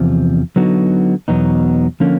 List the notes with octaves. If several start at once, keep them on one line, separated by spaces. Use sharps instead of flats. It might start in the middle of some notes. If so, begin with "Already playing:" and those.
Already playing: E2 C3 F3
D3 F#3 B3 D#4 F#4
E2 B2 F#3 B3 D#4
D3 F3 A#3 C#4